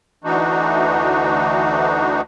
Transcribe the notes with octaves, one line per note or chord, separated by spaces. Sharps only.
D2 E3 D4 D#4 F#4